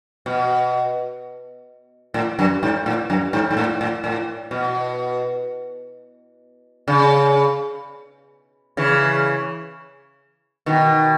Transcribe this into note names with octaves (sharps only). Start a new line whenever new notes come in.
B2
A2
F#2
G#2
A2
F#2
G#2
G#2
A2
A2
A2
B2
C#3
C#3 E3
B2 D#3